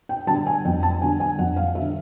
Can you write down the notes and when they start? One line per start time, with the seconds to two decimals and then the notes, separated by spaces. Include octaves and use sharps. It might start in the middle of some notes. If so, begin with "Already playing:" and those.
0.09 G5
0.27 D3 G3 A5
0.46 G#5
0.65 F2 G5
0.83 A5
1.02 D3 G3 G#5
1.20 G#5
1.39 F2 F#5
1.57 F5
1.75 G3 E5
1.80 D3